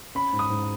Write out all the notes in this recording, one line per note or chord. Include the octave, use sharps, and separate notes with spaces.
C#4 B5
G#2
D#6
G#2